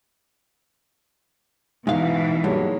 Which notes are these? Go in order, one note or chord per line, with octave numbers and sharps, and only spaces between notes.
G#2 B2 E3 D#4 F5
G2 F#3 G#3 A#3